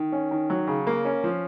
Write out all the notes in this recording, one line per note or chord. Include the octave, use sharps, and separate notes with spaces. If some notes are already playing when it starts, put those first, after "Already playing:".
Already playing: D#3
C#4
D#3
F#3
C#3
A#3
C#4
F3